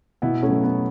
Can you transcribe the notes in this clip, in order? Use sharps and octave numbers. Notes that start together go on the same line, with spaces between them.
B2 B3 E4
A3 C#4
F#3
B3